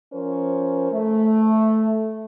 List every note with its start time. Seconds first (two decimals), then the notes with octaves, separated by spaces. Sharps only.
0.13 F3 C#4 A#4 C5
0.92 A3